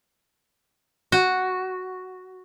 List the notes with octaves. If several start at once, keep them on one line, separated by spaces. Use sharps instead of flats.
F#4